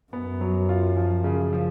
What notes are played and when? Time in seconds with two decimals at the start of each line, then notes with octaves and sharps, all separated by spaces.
0.12 F#2 B3
0.41 F#3
0.69 F4
0.97 F3
1.24 C#3
1.53 F3